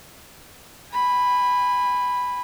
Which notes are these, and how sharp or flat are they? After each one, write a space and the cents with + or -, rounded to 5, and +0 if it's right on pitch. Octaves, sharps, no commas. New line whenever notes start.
G#5 -30 B5 +0